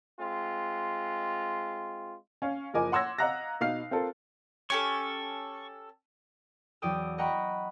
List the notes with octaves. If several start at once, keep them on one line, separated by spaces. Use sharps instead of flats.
G#3 C4 F4
C#4 F5
F#1 F3 A#4 D#5 G#5 D6
F#5 C6 E6 G#6 A#6
D#5 F5 F#5 A#5 F#6 A#6
B2 D#4 F5 F6 C7
C4 F4 A4 A#4
C#4 G4 A4 C#6
E2 F#3 D5 G5 D#6 E6
D#5 F#5 G5 A#5 B5 C#6